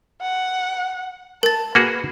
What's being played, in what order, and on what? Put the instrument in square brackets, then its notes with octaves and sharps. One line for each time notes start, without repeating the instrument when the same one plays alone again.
[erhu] F#5
[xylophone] A#4 A6 [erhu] A5
[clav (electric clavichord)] A#3 F#4 G#4 [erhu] B4